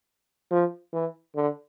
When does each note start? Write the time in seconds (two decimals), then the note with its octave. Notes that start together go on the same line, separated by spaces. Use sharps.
0.51 F3
0.93 E3
1.35 D3